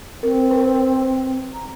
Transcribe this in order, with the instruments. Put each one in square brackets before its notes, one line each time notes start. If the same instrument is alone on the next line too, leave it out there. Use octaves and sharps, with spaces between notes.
[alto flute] C4 [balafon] A#4
[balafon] A#4 B4
[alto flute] A#5